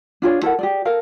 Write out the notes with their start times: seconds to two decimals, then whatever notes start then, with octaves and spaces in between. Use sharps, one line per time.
0.22 D4 F4 G#4 C#5
0.42 E4 A4 A#4 F#5
0.59 G4 G#4 D5
0.85 A4 A#4 F5